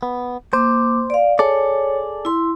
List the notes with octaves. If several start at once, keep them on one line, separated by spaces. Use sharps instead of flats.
B3
A#3 C5 D6
D5 F5
G#4 A4 C#5 D5
E4 C6